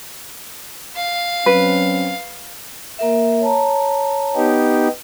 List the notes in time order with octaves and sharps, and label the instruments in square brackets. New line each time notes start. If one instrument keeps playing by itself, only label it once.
[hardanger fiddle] F5
[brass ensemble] F#3 C4 C#4 [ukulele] B4
[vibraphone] A#3 A#4 E5
C#5 A5 A#5
[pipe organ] B3 D#4 G4